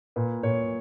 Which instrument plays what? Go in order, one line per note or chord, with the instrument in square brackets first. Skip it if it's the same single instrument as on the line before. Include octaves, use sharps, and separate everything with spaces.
[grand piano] A#2 B4
A#2 C#5